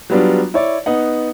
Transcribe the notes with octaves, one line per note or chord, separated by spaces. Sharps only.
F#3 G3 B3 D4 F4
E4 C#5 D5
B3 D#4 F#5